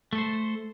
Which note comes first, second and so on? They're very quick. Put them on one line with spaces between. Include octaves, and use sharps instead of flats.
A3 A4 C5